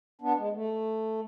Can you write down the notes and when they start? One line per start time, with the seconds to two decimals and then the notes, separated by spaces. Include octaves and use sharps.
0.21 B3 D4
0.38 G#3
0.53 A3